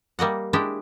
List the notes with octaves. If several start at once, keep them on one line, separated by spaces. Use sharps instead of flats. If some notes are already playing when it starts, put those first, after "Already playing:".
G3 A#3 D#5 F#5
G#3 D4 E4 G4